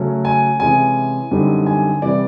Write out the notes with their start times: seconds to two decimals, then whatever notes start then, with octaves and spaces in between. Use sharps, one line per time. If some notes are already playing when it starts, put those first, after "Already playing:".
Already playing: C#3 F#3 A3 C#4
0.25 G#5
0.60 C3 E3 G#3 C#4 G#5
1.31 F#2 D3 G3 C4 D#4
1.66 G#5
2.02 C3 E3 G3 D5